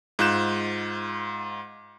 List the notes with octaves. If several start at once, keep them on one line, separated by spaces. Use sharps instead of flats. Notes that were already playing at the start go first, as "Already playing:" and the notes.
G#2 F4 F#6 G6 E7